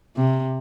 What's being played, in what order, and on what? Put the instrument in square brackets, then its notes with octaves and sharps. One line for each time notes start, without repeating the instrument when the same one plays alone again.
[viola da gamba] C3